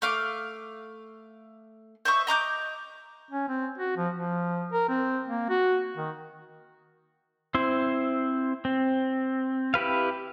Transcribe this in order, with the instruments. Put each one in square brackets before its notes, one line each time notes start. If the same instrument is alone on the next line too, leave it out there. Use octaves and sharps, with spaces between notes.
[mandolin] A3 F5 D6
C5 D#5 E5 C#6
D#5 A#5 D6 G6
[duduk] C#4
C4
F#4
F3
F3
A#4
C4
A#3
F#4
D#3
[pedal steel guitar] C4 E4 C5
C4
E4 G4 B4 F5